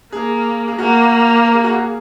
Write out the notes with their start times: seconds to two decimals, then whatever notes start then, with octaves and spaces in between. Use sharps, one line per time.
0.12 A#3 G#4
0.68 G#4
0.78 A#3 F#4
1.44 A#4
1.54 G#4
1.64 F#4
1.73 G#4